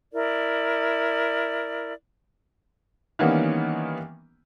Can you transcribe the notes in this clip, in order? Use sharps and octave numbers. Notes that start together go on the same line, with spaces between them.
E4 A#4 D5
D#3 E3 G3 A#3 B3 C#4